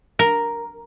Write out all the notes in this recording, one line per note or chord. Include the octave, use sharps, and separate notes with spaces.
A#4